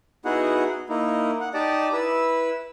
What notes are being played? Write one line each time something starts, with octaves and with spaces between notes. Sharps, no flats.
B3 D#4 E4 F#4 G#4 F#5
A#3 D#4 E4
F#5
D#4 G4 D5 D#5 A5
E4 B4 E6